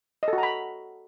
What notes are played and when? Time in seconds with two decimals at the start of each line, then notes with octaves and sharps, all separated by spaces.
0.23 D#5
0.28 A4
0.33 F#4
0.38 A#5
0.43 B5